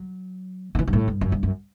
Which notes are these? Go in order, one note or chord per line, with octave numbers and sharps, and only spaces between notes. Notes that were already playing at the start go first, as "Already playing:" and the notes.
Already playing: F#3
D3
E3
G2
A2
G2
F#2
G2
F#2